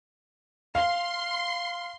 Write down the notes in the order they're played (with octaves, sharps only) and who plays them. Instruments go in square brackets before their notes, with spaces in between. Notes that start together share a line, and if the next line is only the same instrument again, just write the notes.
[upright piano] F5 [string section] C6